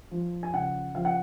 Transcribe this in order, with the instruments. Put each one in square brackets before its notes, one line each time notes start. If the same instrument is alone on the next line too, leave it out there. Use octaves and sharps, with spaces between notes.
[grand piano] F3
G#5
C#3 F#5
F3 F5
F#5